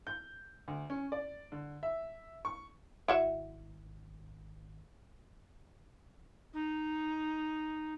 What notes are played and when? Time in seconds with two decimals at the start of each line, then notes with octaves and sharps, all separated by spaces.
0.07 G6
0.68 D2
0.90 C#4
1.12 D5
1.52 D3
1.83 E5
2.45 C#6
3.08 G#1 E4 F#4 E5
6.54 D#4